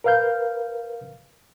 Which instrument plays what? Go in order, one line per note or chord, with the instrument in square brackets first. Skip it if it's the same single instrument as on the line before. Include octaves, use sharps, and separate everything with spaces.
[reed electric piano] A#4 B4 F5 F6 G6